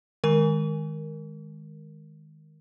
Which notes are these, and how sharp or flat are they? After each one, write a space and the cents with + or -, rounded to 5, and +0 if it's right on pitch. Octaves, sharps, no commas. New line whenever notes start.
D#3 +0 G#3 +0 A#4 +0